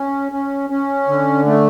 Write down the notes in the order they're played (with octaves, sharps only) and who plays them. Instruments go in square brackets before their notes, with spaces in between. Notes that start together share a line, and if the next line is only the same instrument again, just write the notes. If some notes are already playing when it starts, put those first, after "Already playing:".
Already playing: [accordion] C#4
C#4
C#4
D3
A3